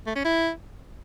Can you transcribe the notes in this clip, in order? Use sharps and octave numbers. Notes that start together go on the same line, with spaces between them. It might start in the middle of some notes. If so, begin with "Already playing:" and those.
A3
C#4
E4